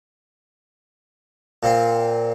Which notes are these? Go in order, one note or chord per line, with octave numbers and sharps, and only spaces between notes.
A#2 C4